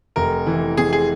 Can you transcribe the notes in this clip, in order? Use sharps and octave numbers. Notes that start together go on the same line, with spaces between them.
F1 A#4
E3
C3 G#4
G#4